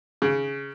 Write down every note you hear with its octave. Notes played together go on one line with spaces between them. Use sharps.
C#3